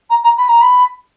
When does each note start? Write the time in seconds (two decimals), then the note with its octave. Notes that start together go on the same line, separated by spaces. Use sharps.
0.10 A#5
0.24 A#5
0.38 B5
0.48 A#5
0.61 B5